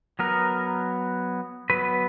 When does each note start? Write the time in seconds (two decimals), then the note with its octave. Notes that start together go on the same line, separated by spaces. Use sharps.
0.19 F#3 B3 A#4
1.70 F#3 B3 B4